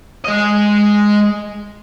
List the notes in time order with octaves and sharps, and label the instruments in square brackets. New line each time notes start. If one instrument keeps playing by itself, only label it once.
[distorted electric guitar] G#3 D#5